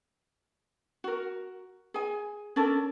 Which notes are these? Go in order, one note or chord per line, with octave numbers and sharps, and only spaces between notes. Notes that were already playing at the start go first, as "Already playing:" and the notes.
F#4 A#4
G#4 G#5
C#4 D4 A4 A#4